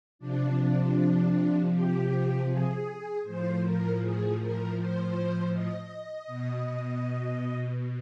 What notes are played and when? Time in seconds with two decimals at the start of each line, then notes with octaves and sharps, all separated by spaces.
0.19 C3 F3 D4
1.72 G4
2.48 G#4
3.23 A2 F3 C5
3.62 A#4
3.99 G#4
4.38 A#4
4.76 C5
5.52 D#5
6.27 B2